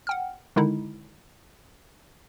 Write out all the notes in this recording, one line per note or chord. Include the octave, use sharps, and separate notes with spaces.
F#5 G5 F6
D3 D#3 G#3 D#4 E4